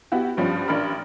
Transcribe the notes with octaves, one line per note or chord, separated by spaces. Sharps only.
B3 E4 F#4 G4
G2 F3 G3 C#4
A1 D4 A#4 B5 F6